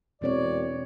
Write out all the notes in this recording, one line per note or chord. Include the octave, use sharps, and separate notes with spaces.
E1 B2 C4 C#5 D5